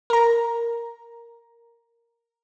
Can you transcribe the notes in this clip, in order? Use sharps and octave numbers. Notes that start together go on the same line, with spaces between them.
A#4 A#5